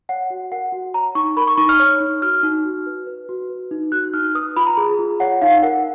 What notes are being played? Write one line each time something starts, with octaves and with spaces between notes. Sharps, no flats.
C#5 F#5
F#4
A#4 F#5
F#4
C#5 A#5
D#4 C#6
A#4 B5
C#6
D#4 C#6
F6
C#5
D#4
F#4 F6
D#4
F#4
B4
B4
F#4
B4
D#4
F#4 F#6
D#4 F6
B4 D#6
F4 B5
A#5
G#4
F4
C#5 F#5
D#4 F5
A#4 F#5